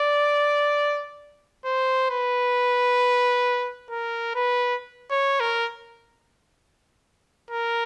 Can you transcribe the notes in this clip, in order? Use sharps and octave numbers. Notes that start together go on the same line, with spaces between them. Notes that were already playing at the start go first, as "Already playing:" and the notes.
Already playing: D5
C5
B4
A#4
B4
C#5
A#4
A#4